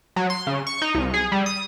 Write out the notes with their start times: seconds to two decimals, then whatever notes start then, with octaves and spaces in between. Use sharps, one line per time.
0.16 F#3
0.30 C6
0.47 C#3
0.67 C#6
0.82 D#4
0.95 C2
1.14 G#4
1.32 G3
1.46 D#6